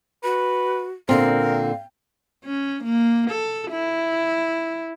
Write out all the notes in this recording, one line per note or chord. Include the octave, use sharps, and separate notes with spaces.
F#4 B4
A#2 D3 C4 A#4 F5
C#4
A#3
A4
E4